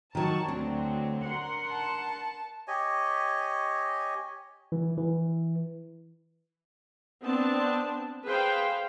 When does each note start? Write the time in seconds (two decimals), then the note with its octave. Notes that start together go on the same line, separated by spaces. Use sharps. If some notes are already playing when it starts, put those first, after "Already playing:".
0.15 D#3 F#3 A5 C#6
0.48 D2 F#3 C4 D4
1.26 A#4 F#5 C6
1.71 A5
2.68 G4 C#5 D#5 G#5
4.72 E3
4.98 E3
7.23 B3 C4 D4 A5
8.25 G#4 B4 C5 F5 G5